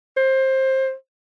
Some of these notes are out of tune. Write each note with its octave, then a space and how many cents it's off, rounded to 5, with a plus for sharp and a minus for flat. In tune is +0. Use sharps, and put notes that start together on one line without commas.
C5 +20